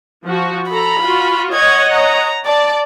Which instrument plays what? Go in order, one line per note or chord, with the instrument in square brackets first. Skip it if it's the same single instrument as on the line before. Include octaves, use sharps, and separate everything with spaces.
[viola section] F3 F#4
[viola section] A4 A#5 [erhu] B5
[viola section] F4 F#4
[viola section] C#5 D#5 F#5 [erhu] G#6
[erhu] A#5
[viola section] D5 [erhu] A5